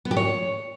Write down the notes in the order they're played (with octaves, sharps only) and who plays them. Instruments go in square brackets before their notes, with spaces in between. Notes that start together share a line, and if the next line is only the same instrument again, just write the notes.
[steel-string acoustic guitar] B3
G4
C#5